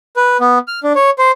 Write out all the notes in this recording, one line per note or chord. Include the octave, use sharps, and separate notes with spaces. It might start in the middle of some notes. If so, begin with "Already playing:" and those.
B4
B3
F6
D4
C#5
C5